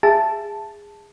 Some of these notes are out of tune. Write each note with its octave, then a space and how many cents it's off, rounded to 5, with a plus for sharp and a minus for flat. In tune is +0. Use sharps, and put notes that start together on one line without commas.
G#4 -20 E5 +15 A5 +0